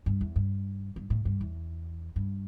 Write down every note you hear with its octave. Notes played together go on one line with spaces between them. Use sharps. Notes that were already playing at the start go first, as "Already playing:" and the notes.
G2
E2
G2
G2
A2
G2
E2
G2